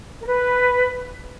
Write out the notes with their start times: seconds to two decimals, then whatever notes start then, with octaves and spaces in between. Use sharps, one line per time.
0.22 A#4
0.27 B4